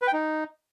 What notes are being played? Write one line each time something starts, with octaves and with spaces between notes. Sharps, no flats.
B4
G5
D#4